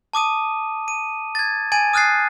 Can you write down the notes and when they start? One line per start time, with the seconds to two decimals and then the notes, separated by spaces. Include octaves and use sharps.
0.13 A5 D6 D#6 D#7
0.88 D#7
1.35 G#6 A6
1.72 G#5 G#6 A6 D#7
1.93 D#6 F6 F#6 A6 C7